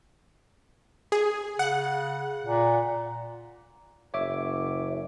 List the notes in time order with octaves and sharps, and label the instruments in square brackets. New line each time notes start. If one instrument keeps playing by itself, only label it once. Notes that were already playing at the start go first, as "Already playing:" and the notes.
[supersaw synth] G#4
[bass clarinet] C#3 [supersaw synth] F#5
[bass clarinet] A#2
[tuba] F#1 [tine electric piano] C#5 E5 D6